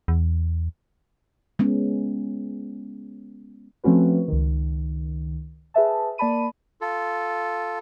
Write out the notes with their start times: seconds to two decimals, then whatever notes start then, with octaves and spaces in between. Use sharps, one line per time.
0.08 E2
1.59 G#3 B3 C#4
3.84 F3 A3 C4 C#4 F#4 B4
4.28 C#2 D#3
5.74 G#4 B4 E5 A5
6.18 A#3 D5 A5 B5 D#7
6.81 F4 A4